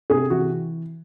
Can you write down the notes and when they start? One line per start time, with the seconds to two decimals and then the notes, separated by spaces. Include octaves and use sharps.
0.10 C3 G#4
0.30 E3 F#4